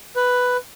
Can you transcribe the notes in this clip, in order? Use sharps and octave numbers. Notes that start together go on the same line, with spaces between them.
B4